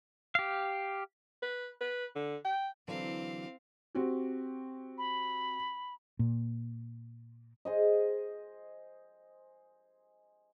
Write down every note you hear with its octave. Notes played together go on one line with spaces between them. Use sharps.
G4 F5
B4
B4
D3
G5
D3 E3 F#3 C4 F5
C4 F#4 G4
B5
A#2
G#4 C5 D#5